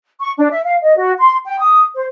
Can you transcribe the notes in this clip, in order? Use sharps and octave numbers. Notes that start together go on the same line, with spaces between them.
C#6
D4
E5
F5
D#5
F#4
C6
G5
D#6
C5